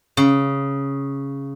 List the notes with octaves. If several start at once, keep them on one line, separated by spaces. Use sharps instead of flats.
C#3